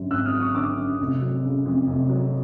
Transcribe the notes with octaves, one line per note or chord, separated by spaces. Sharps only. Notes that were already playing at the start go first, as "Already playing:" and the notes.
Already playing: G#1 F#2 D3 F#3
G#1 E6 F#6
D#6 F6
F#3
C#6 D#6
D3 D6 E6
F#2
F1
F#3
C#3
F2
F1
F#3